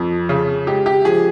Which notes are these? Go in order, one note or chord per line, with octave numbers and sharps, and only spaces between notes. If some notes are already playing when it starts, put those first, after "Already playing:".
Already playing: F2
C#3
G#3 G4
G4
F3 G#4